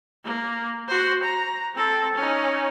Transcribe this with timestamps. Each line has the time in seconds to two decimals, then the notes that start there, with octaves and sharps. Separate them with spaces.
0.24 A#3
0.88 F#4 C5
1.23 A#5
1.75 C4 A4
2.15 C#4 D#4